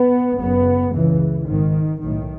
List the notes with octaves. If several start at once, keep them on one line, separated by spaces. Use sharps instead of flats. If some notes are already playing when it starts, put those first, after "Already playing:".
Already playing: B3
F#1 F#2 C#3 B3
C#2 C#3 E3
G#1 G#2 D#3
B1 A2 D#3